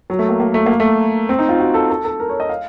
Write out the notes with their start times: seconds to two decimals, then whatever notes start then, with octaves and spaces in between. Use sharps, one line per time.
0.10 F#3
0.19 A3
0.29 A#3
0.40 A#3
0.54 A3
0.66 A#3
0.80 A3
1.29 C4
1.39 D#4
1.49 F4
1.59 F#4
1.74 A4
1.89 A4
2.05 A4
2.20 A#4
2.29 C#5
2.40 D#5
2.49 F5